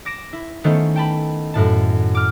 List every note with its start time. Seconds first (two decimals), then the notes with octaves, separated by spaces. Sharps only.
0.05 D6 A#6 D7 E7
0.33 E4
0.64 D#3 A3 B3 C#4 C5
0.96 G5 A5 B5
1.54 F#2 A2 A5
2.15 D6 F6